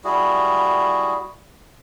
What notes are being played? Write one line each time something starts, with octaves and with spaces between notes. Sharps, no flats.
G3 E4 F#4 G#4